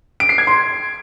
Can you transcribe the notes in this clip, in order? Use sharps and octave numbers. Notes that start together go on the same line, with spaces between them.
D7
C7
G#6
C6